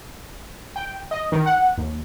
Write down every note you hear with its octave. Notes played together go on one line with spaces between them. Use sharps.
G5
D#5
D#3
F#5
D#2